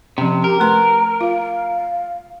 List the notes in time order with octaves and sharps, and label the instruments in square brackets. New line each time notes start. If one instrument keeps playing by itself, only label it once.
[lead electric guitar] C3 [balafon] F3 C#4
[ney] G4 [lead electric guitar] A#4
[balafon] A3 B4 C6 [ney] A#5
[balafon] F4 [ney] F5